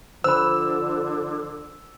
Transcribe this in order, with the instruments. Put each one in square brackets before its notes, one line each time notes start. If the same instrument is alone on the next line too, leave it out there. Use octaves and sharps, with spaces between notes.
[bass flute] D3 [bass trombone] F3 [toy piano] C5 B5 [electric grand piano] E6